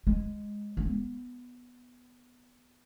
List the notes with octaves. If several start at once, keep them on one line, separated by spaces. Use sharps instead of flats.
G#3
C#4
B3